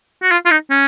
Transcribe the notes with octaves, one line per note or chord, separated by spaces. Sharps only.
F#4
F4
F4
D#4
C#4